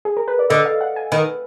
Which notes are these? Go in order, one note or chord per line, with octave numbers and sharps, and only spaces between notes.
G#4
A#4
B4
D5
D3 D#5
F5
F#5
G#5
D#3 B4